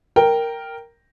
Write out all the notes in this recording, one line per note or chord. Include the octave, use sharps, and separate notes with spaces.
A#4 G5